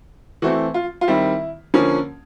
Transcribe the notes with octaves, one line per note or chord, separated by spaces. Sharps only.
E3 A3 C4 F#4
F4
F4
D#3 G3 C4 E4
D3 F3 A#3 C#4